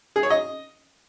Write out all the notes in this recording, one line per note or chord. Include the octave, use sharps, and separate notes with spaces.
G#4
C#5
D#5